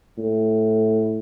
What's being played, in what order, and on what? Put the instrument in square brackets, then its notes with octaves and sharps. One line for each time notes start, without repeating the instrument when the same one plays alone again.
[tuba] A2